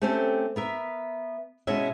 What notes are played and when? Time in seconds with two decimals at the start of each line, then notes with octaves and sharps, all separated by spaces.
0.01 A3 C4 C#4 G4 A4 C5
0.56 B3 A#4 E5
1.67 B2 G#3 C#4 E4 E5